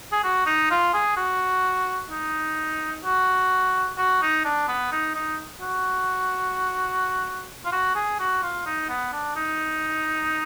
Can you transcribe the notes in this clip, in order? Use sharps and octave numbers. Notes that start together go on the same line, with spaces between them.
G#4
F#4
D#4
F4
G#4
F#4
D#4
F#4
F#4
D#4
D4
B3
D#4
D#4
F#4
F4
F#4
G#4
F#4
F4
D#4
B3
D4
D#4